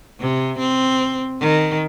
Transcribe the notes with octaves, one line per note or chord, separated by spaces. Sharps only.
C3
C4
D#3